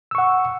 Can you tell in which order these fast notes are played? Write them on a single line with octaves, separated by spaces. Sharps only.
E6 C#6 F#5